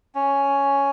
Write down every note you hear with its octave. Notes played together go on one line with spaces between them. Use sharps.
C#4